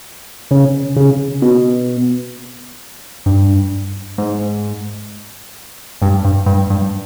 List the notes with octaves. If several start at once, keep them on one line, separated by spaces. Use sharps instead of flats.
C#3
C#3
B2
G2
G#2
G2
G2
G2
G2